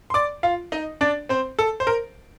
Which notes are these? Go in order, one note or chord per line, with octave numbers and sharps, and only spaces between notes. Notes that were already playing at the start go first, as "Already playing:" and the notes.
C6
D5 D6
F4 F5
D#4 D#5
D4 D5
C4 C5
A4
C5
A#4